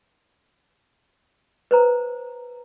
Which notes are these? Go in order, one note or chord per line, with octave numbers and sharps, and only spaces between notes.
B4 C5 A#5